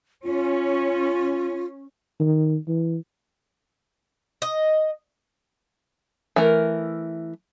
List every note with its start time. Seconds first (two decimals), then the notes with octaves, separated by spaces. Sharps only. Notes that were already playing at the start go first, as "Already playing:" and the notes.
0.24 C#4 F4
2.20 D#3
2.68 E3
4.42 D#5
6.36 E3 A3 A#4